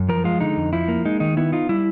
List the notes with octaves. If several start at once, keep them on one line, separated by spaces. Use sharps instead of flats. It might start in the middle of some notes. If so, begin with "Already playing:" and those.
Already playing: F#2
F3 A#4
G#3 F4
D3 D#4
F2
F3 E4
A#3
G#3 D#4
D#3 D#4
B3 E4
D#4 F4
G3 E4